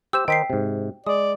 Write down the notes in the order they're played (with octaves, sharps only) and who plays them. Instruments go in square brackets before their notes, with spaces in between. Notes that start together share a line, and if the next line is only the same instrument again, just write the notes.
[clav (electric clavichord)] G4 C5 [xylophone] E6 G6 E7
[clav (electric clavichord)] D#3 D#4 C5 [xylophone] G5 B6 C7
[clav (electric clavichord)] G#2 C3
[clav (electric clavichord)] G#3 [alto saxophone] D5 [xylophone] D#6